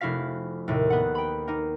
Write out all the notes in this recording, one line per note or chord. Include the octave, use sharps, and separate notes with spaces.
F1 E4 F#4 F5 B6
D#2 A2 C3
B3 F#5
G5 B5
A#3 D#4